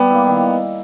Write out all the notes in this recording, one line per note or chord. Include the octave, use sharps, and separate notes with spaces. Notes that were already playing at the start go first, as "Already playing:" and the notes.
Already playing: G3 B3
A#3 E4
D#3